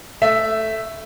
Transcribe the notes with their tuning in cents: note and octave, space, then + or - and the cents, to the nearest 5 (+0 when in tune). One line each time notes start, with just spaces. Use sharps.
A3 +0 E5 +0